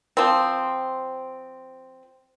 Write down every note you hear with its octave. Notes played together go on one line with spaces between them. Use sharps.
F3 C4